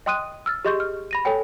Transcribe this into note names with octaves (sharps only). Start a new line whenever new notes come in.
D#5 G5 C6 D#6 F#6 D#7
E6 F6 A6
G4 G#4 D#5 C6 C#6 G6
F6
B5 A#6 D#7
A4 C#5 G5 G#5